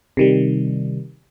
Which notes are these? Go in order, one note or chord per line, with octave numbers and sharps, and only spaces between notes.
C3 D#3 G3